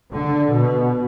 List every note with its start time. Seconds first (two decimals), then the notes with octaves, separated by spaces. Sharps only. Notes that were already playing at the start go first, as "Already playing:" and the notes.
0.12 D3
0.53 B2